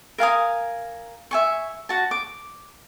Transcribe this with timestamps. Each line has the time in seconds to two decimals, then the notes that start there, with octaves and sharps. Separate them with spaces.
0.18 A#4 F5 G#5 D#6
1.31 E5 G#5 C#6
1.89 F#4 A5
2.11 D6